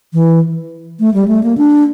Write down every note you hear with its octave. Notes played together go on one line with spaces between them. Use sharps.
E3
A3
G3
A3
A#3
D4